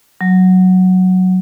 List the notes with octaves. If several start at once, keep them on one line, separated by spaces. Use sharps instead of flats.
F#3